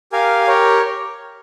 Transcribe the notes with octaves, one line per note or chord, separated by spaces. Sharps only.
G4 A#4 F5 G#5
G4 A#4 C#5